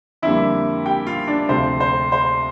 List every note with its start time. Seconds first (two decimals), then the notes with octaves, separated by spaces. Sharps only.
0.22 F2 D3 G3 A#3 E4 E5
0.86 G4 G5
1.07 F4 F5
1.27 D4 D5
1.49 D2 C3 F3 A3 C5
1.80 C5
2.12 C5